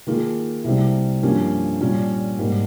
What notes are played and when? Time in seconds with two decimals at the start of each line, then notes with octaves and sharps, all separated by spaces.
0.07 D#3 A#3 F4 G#4
0.64 C2 C3 G3 C4
1.23 G2 F3 A#3 C#4 G4
1.81 A#2 G3 C#4
2.39 G#2 G3 A#3